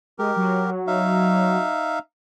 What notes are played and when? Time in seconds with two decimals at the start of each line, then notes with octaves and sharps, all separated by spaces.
0.19 G#3 G4 A#4
0.36 F#3
0.87 D#4 E5 F5